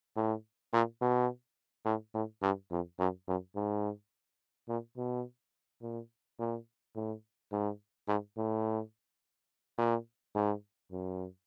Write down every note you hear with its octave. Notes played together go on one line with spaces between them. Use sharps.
A2
A#2
B2
A2
A2
G2
F2
F#2
F#2
G#2
A#2
B2
A#2
A#2
A2
G#2
G#2
A2
A#2
G#2
F#2